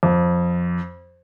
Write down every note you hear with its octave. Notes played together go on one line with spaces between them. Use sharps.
F2